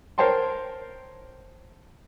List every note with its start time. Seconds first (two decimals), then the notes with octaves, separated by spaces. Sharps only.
0.18 A#4 C5 C#5 G5 A5 C6